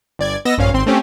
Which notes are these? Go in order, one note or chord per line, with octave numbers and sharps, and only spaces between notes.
G1 D5 G#6
B3 D#5 E6 A#6
A#1 G2 C#4 F5
G#1 C4 C6
A3 C4 C#4 G4